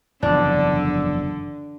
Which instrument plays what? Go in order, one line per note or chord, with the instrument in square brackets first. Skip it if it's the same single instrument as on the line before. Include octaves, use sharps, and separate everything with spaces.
[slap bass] F#1 E2 F3 [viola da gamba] D3 [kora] D4